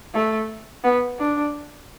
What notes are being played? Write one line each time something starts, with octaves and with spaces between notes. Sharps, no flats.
A3
B3
D4